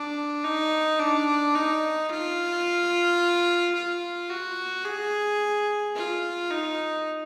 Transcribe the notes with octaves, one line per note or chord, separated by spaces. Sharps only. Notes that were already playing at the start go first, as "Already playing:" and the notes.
Already playing: D4
D#4
D4
D#4
F4
F4
F#4
G#4
F4
D#4